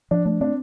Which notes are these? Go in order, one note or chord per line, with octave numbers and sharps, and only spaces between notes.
F3 D4
A3 D4
C4 D4